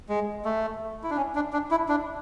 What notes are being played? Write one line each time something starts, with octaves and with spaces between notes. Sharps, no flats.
G#3
A3
E4
D4
C#4
D4
D4
E4
D4